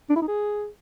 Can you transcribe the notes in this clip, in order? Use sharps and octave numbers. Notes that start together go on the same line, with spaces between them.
D4
E4
D#4
G#4